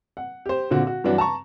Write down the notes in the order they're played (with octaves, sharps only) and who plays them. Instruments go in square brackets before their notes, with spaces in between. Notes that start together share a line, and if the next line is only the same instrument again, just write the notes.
[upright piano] F#5
G4 C5
A#2 D3 C4 F#4
F#4
G2 E3 F#3 D4 F#4
A5 A#5 C#6